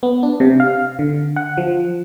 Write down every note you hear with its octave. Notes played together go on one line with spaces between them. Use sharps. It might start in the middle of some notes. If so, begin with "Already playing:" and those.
B3
D4
C3
F5
D3
F#5
F3